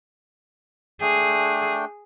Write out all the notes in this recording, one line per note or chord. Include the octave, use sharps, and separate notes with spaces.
A3 D4 G#4 G5